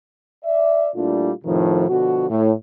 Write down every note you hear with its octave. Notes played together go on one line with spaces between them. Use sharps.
D5 E5
A#2 G3 A3 D4 E4 F4
F2 A2 C3 D#3 F3
B2 D3 F3 F#4
A2